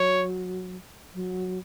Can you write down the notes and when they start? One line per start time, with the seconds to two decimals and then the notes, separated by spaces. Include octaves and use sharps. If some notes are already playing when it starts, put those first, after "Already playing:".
Already playing: F#3 C#5
1.14 F#3